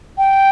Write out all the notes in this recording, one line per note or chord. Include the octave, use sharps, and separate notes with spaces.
G5